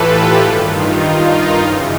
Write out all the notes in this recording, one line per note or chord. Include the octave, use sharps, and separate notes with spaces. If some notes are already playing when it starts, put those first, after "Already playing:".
Already playing: A2 E3 F4 G4 A4 B4
F4 G4
G2 D#3 F#4 G#4
D#4 F4
D#4 F4
F#2 C#3 E3